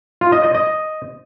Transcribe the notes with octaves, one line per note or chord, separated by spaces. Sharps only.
F4
D#5
D#5
D#5